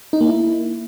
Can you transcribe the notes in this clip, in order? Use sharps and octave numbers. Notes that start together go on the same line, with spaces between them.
D#4
A#3
E4